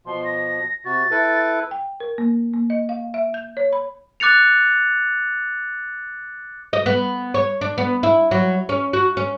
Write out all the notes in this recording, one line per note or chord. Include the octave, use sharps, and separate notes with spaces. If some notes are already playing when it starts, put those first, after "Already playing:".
B2 F3 C6
A#6
C3 F#4 A6
E4 A4 B4
G5
A#4
A#3
A#3
D#5
F5
E5
G6
C#5
B5
D6 F#6 A6 C#7 F7
D#5
B3
C#5
D4
B3
E4
F#3
C#4
F#4
C#4